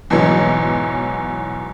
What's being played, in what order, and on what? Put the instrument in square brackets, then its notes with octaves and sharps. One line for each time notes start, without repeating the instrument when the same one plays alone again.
[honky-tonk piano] E2 G#2 B2 E3 F#3